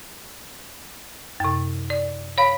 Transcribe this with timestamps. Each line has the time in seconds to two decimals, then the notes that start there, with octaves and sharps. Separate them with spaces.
1.40 F#2 C3
1.90 D5
2.38 C#5 F5 B5